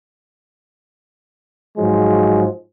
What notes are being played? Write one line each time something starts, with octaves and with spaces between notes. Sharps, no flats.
G#2 F3 F#3 G#3